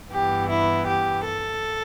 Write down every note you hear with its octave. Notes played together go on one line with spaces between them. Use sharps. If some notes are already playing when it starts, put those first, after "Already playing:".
G2 E3 B3 G4
E4
G4
A4